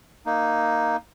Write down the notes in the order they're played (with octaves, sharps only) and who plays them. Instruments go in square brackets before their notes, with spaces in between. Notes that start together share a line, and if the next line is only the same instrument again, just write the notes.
[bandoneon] A#3 D#4